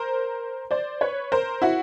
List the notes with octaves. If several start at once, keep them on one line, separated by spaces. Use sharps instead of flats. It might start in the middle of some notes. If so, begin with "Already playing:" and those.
Already playing: A#4 C5
C5 D5
B4 C#5
A#4 C5
E4 F#4